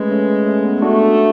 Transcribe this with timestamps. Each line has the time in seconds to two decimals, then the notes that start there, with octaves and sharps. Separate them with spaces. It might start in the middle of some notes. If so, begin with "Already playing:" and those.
Already playing: G#3 A3 C#4 G#4 B4
0.11 A3 C#4
0.46 A3 C#4
0.64 B3
0.82 A3 D4 F#4